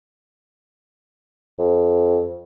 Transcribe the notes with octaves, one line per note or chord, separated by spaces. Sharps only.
F2